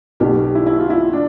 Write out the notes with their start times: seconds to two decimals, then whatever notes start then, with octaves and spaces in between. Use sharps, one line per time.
0.20 B1 B2 G4
0.44 G4
0.55 E4
0.66 E4
0.80 F4
0.90 E4
1.13 D4